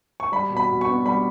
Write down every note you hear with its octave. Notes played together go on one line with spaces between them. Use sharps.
C#6
G3 B5
B2
B5
B2
C#6
B3
G3 B5